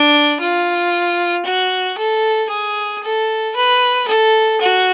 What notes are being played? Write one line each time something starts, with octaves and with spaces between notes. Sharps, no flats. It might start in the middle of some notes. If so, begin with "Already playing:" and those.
Already playing: D4
F4
F#4
A4
G#4
A4
B4
A4
F#4